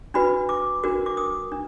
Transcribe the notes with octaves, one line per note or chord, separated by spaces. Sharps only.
D4 F#4 B4 B5
D6
D4 F#4 A#4
D6
D#6
D4